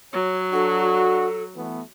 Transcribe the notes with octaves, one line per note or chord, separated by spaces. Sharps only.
F#3 C#5
D4 F#4 A4
E3 A3 B3